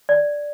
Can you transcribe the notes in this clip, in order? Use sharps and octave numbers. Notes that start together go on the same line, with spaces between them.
D5